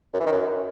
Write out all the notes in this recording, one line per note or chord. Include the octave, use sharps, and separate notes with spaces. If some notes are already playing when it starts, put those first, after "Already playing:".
F#2
E3
D#3
F#2